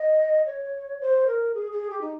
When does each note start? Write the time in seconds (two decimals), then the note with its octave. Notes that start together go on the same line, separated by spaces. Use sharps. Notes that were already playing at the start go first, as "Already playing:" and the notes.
Already playing: D#5
0.46 C#5
1.00 C5
1.27 A#4
1.54 G#4
1.72 G#4
1.90 G4
2.01 D#4